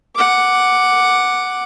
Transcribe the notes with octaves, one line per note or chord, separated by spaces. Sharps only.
F#5 D6